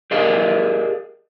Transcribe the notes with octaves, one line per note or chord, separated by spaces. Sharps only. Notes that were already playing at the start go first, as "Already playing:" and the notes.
G4 G#4 A#4 D5 D#5 F5